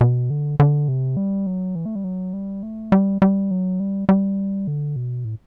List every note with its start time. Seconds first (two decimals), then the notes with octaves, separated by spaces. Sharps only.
0.01 B2
0.30 D3
0.60 D3
0.88 C3
1.17 G3
1.47 F#3
1.75 E3
1.86 A3
1.95 G3
2.04 F#3
2.33 G3
2.63 A3
2.92 G3
3.22 G3
3.51 F#3
3.80 G3
4.09 G3
4.67 D3
4.96 B2
5.25 A2